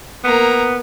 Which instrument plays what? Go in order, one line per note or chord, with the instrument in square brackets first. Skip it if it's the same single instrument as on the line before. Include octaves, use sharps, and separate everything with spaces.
[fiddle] A#3 A#5 [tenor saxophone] B3